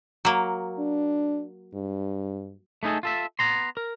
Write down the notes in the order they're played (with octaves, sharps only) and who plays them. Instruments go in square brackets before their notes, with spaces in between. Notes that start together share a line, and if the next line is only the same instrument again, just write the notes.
[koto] F#3 A#3
[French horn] D4
G2
[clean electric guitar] A3 B3 D#4 G#4 A4
F4 A4 E5
B3 A#5 C6
A#4